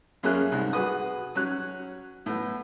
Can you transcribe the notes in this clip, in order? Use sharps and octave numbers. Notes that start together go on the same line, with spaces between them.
F#2 A#3 C#4 G#4 E5 F#6
C2 G#2
F#4 G#4 B4 D#6
F#3 C#4 F#6
A2 B3